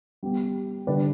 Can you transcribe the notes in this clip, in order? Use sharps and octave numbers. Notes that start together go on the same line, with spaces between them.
G3 B3 G4
D3 G3 D4 B4 D5